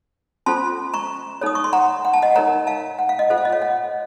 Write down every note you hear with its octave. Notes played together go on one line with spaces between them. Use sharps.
C#4 F4 A4 C5 A5 C6
A#5 C#6
D#4 A4 C#5 D#6
C#6
C6
F#5 A#5
F#5
A5
D#5 F#5
D#4 A#4 C#5 F#5 A#5
F5 A5
F#5
F5
D#5 F#5
F4 A4 C5 F#5
F5
D#5
C#5 F5
D#5 F#5